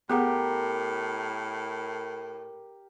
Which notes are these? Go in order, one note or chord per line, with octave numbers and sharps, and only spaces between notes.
A2 B3 G4 G#4 A#4 F#5